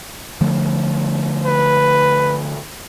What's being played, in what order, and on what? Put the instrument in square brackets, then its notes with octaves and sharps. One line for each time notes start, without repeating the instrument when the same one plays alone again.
[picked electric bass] D3 F3 A3
[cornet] B4